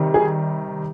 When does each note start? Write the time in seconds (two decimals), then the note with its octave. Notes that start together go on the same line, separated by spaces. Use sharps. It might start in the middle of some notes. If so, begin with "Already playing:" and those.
Already playing: C3 D#3 G3
0.14 G#4